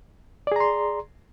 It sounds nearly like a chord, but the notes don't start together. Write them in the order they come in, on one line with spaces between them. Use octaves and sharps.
D5 G#4 A#5 C6